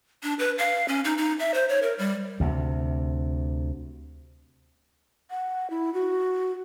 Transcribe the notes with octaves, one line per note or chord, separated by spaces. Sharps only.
D4
B4
F5
C#4
D#4
D#4
E5
C5
C#5
A#4
G3
D2 C3
F#5
E4
F#4